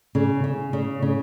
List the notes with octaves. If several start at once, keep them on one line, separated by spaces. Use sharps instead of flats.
C#3
C#3
C#3
C#3